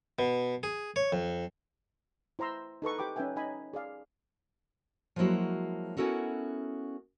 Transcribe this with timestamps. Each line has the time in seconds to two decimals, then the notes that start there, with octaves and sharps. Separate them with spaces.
0.19 B2
0.63 G#4
0.96 C#5
1.12 F2
2.39 E4 C5 A#5 C6 E6
2.82 D#4 A4 B4 C#6
2.98 G4 B4 G5 B5 D6
3.16 C#4 D#4 B4 E5 G5 G#5
3.36 D#4 D#5 G#5 B5
3.73 G#4 D5 F5
5.16 F3 F#3 G#3 A#3 E4 F#4
5.97 B3 C#4 E4 F#4 A4 A#4